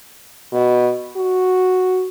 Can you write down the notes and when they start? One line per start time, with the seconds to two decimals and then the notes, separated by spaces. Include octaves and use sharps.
0.52 B2
1.16 F#4